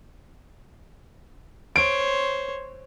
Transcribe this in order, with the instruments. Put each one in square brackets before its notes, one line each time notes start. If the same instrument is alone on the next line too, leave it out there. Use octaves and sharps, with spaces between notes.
[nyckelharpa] C5 C#5 [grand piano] D7